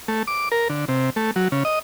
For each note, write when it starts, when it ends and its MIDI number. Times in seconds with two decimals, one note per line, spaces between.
0.08 0.23 57
0.27 0.49 86
0.52 0.68 70
0.70 0.85 50
0.88 1.10 48
1.16 1.31 57
1.36 1.48 54
1.52 1.63 49
1.65 1.79 75